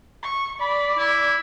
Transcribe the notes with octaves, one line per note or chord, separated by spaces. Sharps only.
C#6
D5 B5
E4